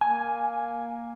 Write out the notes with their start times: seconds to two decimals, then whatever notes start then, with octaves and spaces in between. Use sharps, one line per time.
0.01 A#3 G#5